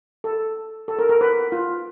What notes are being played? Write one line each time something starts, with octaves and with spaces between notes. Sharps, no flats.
A4
A4
A#4
A#4
B4
F4